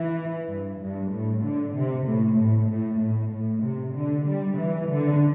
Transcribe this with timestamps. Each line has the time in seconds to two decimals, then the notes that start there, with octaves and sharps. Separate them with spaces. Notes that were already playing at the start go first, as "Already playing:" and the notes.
Already playing: E3
0.48 G2
0.80 G2
1.11 A2
1.42 D3
1.74 C3
2.06 A2
2.36 A2
2.69 A2
3.00 A2
3.31 A2
3.62 C3
3.94 D3
4.25 G3
4.57 E3
4.89 D3